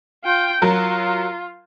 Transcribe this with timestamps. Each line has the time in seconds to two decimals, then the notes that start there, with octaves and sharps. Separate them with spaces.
0.24 F4 G5
0.62 F#3 F4 A#4